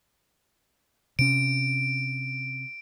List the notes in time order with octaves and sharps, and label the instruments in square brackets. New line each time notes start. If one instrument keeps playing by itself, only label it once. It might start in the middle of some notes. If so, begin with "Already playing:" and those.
[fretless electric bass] C3 C#4 [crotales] D7